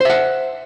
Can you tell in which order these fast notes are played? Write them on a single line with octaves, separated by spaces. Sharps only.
C5 E5 F#5